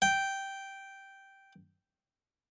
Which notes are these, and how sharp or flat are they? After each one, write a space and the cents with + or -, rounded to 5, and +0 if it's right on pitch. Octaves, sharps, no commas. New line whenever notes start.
G5 -5